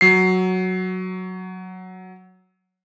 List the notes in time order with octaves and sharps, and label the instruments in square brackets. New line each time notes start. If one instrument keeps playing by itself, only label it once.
[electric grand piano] F#3 C7